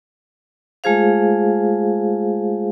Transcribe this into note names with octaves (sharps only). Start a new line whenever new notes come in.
G#3 A3 F4 G#4 C5 F5